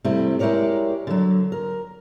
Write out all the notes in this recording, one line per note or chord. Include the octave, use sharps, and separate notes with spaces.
C3 G3 A3 E4
G#3 E4 G4 A#4 C#5 D5
D3 F#3
A#4